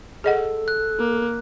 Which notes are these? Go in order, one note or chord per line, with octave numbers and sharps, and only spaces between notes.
G#4 A4 D#5 F#5
F#6
A#3